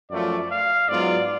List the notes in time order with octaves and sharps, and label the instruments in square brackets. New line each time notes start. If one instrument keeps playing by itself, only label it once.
[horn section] F#2 F3 A3 F4 [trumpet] D5
[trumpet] F5
[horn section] G#2 F#3 B3 F4 [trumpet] D5